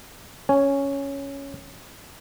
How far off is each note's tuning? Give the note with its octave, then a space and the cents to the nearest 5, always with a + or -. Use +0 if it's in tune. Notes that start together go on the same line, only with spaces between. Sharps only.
C#4 +0 G#5 +0